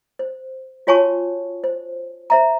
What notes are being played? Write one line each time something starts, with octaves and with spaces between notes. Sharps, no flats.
C5
F4 F#4 C#5 G#5 A5 C#6
C5
C5 E5 A#5